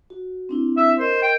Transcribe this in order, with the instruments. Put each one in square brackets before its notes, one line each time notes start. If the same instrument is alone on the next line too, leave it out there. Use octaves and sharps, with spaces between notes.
[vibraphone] F#4
C4 D4 E4
[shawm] E5
[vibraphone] A#4 D#5 [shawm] C5
[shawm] G5